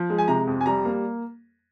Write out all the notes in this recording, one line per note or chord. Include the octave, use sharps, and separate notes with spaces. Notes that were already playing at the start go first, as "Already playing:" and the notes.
Already playing: F3
G#3
G#5
C3 A#5
F2
G#5
G3 A#5
A#3